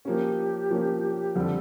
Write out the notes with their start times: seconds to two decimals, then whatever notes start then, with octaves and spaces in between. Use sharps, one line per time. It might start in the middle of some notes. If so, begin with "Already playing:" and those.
0.05 F3 A#3 C#4 G4
0.71 F3 A#3 C#4
1.36 F2 D3 G3 A4